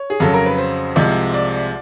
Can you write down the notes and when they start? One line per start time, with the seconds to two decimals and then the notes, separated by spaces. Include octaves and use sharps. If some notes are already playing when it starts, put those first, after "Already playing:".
Already playing: C#5
0.10 G#4
0.20 F2 C#3 F#3 A4
0.34 A#4
0.46 B4
0.58 C5
0.96 C2 C3 F3 G#3
1.34 D5